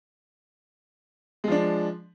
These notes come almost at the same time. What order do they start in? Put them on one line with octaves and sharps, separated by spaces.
G#3 F3 D4